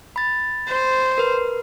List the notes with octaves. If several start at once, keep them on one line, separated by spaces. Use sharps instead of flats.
B5 A6
C5
A#4 B4